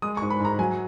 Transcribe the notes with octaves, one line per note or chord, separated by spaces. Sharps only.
G#3 D#6
C#6
G#2
B5
G#2 A#5
F#3 G#5